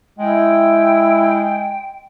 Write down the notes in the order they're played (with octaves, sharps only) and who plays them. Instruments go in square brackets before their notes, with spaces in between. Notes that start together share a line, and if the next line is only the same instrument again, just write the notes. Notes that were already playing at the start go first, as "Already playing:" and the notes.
[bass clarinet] G#3 [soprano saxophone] E4 [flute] G5